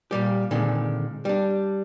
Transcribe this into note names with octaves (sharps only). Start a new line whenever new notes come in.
A#2 G3 G4
A#2 D3 D#3 G#3 C4
G3 D4